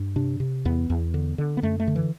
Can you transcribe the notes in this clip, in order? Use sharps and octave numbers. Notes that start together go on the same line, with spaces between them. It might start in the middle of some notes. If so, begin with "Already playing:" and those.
Already playing: G2
C3 D4
C3
E2 B3
E2
D3
D3
B3
F#2 A3
A3
D3
E3